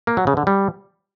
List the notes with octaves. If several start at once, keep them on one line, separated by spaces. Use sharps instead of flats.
A#3
F#3
C#3
D3
G3